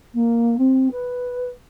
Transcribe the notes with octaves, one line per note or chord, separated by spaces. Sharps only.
A#3
C4
B4